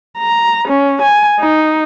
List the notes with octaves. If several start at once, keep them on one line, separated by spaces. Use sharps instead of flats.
A#5
C#4
G#5
D#4